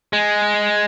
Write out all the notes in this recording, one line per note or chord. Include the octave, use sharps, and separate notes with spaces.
G#3